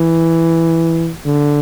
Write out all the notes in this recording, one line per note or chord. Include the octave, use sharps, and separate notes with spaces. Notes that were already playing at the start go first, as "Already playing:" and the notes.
Already playing: E3
D3